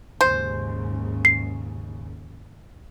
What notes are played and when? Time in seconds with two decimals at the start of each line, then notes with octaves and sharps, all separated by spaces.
0.21 D#2 G#2 C#3 C5
1.25 C7